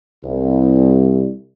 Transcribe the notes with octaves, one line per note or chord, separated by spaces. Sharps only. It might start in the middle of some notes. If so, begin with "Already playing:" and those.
C2